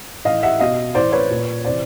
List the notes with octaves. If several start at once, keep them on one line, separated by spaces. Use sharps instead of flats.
A2 E3 D#5 F5
E5 F#5
B2 D#5 F5
A2 E3 C5 D5
B4 C#5
A#2
C3 E3 C5 D5